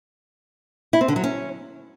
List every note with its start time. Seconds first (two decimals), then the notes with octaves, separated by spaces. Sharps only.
0.93 E4
1.01 C4
1.08 D3
1.16 F#3
1.24 C#4